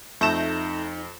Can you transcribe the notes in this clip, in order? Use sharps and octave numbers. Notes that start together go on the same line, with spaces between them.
F2 A3 D#4 G6 A#6 E7